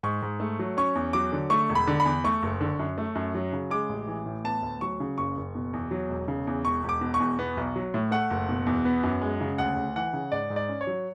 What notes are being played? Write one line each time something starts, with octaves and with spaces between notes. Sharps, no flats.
G#2 C#6
G#2
A3
F#3
C#4 C#6
E2
F#3 D6
D3
A3 C#6
E1
B5
D3
B5
E2
A3 C#6
F#1
D3
F#2
A3
F#2
F#3
C#3
G#3 D6
A1
E3
A2
B3 A5
D2
F#3 C#6
C#3
F#1 C#6
F#1
B2
E2
F#3
E1
C#3
E2
E1 C#6
E1
D6
B2
C#6
E2
B3
B1
F#3
A2
A3 F#5
F#1
B2
E2
B3
F#2
G#3
C#3
D2 F#5
D2
E3 F#5
C#3
G#2 D5
G#2
D5
C#4
C#5
F#3